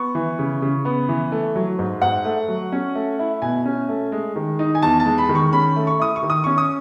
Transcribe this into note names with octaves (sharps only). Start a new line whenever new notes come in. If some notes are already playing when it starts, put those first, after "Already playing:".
Already playing: B3 C#6
E3
C#3
C#3
B3
E3
A3
F#3
G#2
G#2 F#5
A3
F#3
C#4
A3
E4
B2 G#5
C#4
A3
G#3
D#3
D#4
G#5
E2 A5
A5
G#3
B5
D#3
C#6
C#4 B5
A3
C#6
E4 D#6
C#6
D#3
D#6
C#4 C#6
D#6